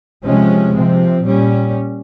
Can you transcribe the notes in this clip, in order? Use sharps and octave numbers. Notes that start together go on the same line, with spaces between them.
C3 F3 G#3 C#4
C3 F3 C4
A#2 G3 C#4